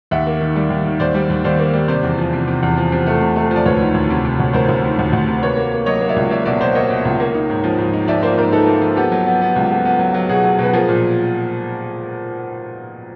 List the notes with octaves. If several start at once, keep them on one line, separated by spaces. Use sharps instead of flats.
D#2 E5 F#5
A#3
D#3
G3
D#2
D#3
D#2 C5 D5
G3
D#2
D#2 C5 D5
A#3
G3
C3 C5 D5
E2
F3
C3
C3
E2
F3
C3
A3
C3
A3
F3
D5
D2 B4 C#5
D#3
D2
C3
C3
D2
D2 A#4 C5
D2
D#3
D2
D2
C3
A#3 B4 C#5
A#3
A#3
F#3 C#5 D#5
A#3
D5 E5
C#2
A#3 D5 E5
B2 D5 E5
B2 C5 D5
A#3 C#5 D#5
B2
C#2
A#3
D#4
G#2
F3
G#2
D#4
F3 D5 E5
A#3 C5 D5
G#2 A#4 C5
D#4 A4 B4
A#3
F3
B3 G4 A4
F#3
B3
B3
C#2
B3
B3
F#3
F#3
B2 F#4 G#4
F#3
B2 B4
F3 G#4 A#4
A#2